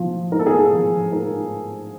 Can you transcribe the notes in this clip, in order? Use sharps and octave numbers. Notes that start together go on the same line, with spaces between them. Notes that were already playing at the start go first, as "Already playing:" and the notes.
Already playing: F3
G#2 A#4
A4
G#4
A4
F3
G#2 A#4